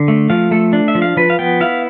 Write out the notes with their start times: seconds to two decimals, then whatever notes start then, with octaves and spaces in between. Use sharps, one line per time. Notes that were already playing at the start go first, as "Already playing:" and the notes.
Already playing: D3
0.08 A3
0.30 F3 F5
0.51 A3 A4
0.73 D4
0.88 E5
0.95 F3
1.02 F5
1.17 F3 B4
1.30 F5
1.39 B3 G5
1.60 E4 F5